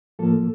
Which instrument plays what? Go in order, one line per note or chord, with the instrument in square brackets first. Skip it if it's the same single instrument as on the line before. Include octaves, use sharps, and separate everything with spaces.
[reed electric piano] A2 F3 A#3 A4